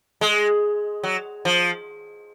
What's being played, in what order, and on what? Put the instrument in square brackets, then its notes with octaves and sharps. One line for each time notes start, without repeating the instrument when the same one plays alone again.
[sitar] G#3
F#3
F3